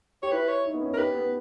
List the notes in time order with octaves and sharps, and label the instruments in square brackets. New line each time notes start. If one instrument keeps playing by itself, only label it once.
[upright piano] G4 [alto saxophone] C#5
[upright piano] E4 [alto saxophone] B4
[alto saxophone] C#5
[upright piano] D#4
B3
C#4
[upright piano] D#4 [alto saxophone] A#4
[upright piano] G4 [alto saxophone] B4
[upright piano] B3